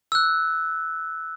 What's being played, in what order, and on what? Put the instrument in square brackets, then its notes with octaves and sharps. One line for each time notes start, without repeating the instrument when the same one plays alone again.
[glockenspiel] E6 F#6